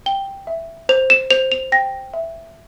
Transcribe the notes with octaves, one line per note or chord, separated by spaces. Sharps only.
G5 G7
E5
C5 F7
E7
C5 F7
F7
G5 A#6
E5